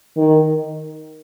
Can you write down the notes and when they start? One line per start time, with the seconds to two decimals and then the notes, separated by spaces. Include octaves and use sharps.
0.17 D#3